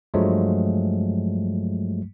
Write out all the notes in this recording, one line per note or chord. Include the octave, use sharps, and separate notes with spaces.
G2 F3 F#3 G#3 A3